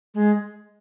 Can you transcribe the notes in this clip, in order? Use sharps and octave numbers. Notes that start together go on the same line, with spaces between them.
G#3